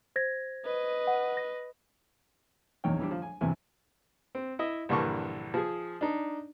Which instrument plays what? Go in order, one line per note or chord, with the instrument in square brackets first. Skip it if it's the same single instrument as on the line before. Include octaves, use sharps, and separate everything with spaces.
[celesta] C5 G#6 A#6
[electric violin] B4 D#5
[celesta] F#5
A#6
[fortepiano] A#1 E2 D#4 C#5 G5
E3 G3 D4
F3
G#5
E2 G2 C3 E3 E4 G#5
C4
E4 D#5 E5
A#1 G2 D3 E3 A#4 C#6
F3 G#4
D4 D#4